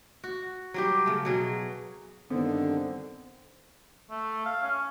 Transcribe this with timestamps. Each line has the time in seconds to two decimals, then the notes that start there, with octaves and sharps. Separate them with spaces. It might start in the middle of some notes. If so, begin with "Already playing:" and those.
0.24 F#4
0.74 F#3 G3 G4
1.06 C#3 A3
1.25 B2 F#3 G#4
2.30 G2 D3 D#3 B3 C4
4.10 A3
4.46 F5
4.63 C#4